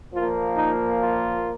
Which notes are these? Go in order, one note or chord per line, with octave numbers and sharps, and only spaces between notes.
A#2 F3 A#3 F4
D#4
F4